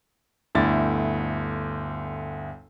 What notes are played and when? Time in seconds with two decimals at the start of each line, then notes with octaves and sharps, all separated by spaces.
0.55 G1 D2 E4 A6